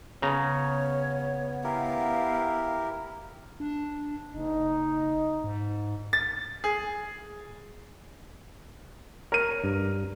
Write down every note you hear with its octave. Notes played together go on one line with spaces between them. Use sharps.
C#3 B3 C#5 A#5
E4 G4 A#4 F5
D4
F#1 D#4
G#2
A6
G#4
A#4 C#5 D#7
G2